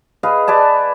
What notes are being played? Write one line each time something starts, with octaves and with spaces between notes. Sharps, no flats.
G#4 B4 D#5 F5
B4 D5 G#5 A5